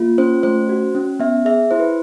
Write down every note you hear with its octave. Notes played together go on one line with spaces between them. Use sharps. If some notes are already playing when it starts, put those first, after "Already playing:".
Already playing: A#3 F4
C#4 C5
A3 C5
F#4
C#4
B3 E5
G#4 E5
E4 C5
B4